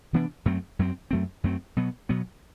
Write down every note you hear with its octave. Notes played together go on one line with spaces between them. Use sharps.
C3 E3 B3 D4
F#2 F#3 A3 C4
F#2 F#3 A3 C4
F#2 F#3 A3 C4
F#2 F#3 A3 C4
B2 F#3 B3
B2 F#3 B3